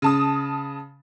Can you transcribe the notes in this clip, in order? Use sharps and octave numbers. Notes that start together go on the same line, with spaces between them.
C#3 A5 D#6